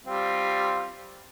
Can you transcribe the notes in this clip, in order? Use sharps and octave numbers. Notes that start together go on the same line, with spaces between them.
G3 C4 F4